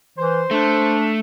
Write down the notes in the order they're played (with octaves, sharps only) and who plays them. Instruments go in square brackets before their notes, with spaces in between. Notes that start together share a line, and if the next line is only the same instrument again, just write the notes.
[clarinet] E3 [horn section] C5
[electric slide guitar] A3 [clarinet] D4